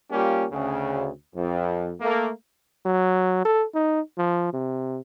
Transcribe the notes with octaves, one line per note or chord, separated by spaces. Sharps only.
G3 A#3 C#4 F4 G4
D2 C#3
F2
A3 A#3
F#3
A4
D#4
F3
C3